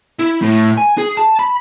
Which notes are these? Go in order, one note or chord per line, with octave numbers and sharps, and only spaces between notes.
E4
A2
G#5
G#4
A5
B5